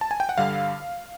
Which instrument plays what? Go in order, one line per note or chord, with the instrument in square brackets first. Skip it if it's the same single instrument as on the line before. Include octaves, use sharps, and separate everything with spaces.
[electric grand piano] A5
G#5
G5
F#5
G2 D3 G3 F5